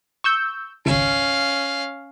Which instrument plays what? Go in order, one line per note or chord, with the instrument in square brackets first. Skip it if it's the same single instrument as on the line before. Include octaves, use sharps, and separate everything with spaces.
[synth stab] C#6 E6 G6
[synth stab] G#1 C#2 [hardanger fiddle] C#4 F5